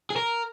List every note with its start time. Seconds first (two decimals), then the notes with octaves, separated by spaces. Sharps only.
0.10 G#4
0.16 A#4